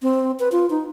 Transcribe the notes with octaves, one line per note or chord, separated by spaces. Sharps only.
C4
B4
F4
D#4